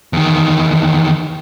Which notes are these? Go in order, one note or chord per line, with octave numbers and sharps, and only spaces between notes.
E2 D#3